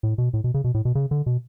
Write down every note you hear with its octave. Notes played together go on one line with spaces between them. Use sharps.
A2
B2
A2
B2
C#3
B2
A2
B2
C#3
D3
B2